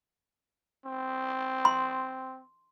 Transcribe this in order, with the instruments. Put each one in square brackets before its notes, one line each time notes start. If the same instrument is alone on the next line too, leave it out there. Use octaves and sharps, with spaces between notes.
[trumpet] C4
[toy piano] C6